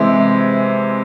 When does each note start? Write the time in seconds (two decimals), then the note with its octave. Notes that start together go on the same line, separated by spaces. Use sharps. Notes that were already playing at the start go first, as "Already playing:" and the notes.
Already playing: C3 E3 G#3 E5